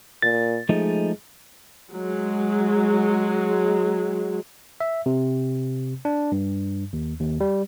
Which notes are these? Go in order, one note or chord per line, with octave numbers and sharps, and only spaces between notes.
A#2 A6
F3 G#3 A3 D#4
F#3 G#3
E5
C3
D4
G2
D#2
D#2
G3